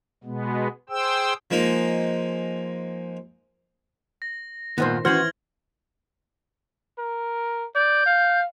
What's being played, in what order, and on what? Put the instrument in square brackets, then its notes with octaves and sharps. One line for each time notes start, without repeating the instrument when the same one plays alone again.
[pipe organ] B2 G#3 B3
G#4 C5 G5 E6
[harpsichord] F3 G#3 A#3 D#4
[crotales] A#6
[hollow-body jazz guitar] G2 A#2 B3 [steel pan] D#3 C5
[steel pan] E3 C5 [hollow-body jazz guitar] C#4 F#4 [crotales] F6 G#6 F#7
[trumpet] A#4
[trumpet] D5 [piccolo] G6
[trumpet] F5